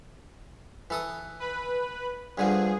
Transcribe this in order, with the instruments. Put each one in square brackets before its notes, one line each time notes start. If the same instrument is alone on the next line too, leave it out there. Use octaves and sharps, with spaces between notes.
[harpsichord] E3 A4 D#6
[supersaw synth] B4 B5
[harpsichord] G2 D3 F3 [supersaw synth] G#4